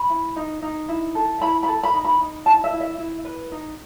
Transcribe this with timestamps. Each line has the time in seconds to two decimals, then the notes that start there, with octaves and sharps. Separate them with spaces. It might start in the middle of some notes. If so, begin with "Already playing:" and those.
Already playing: B5
0.10 E4
0.36 D#4
0.62 D#4
0.88 E4
1.15 A4
1.41 E4 B5
1.63 B5
1.67 A4
1.83 B5
1.94 D#4
2.04 B5
2.21 D#4
2.45 E4 A5
2.64 E5
2.72 E4
2.81 E5
2.98 E4
3.25 B4
3.52 D#4